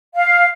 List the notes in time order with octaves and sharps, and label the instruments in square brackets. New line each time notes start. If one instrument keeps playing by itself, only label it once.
[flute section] F5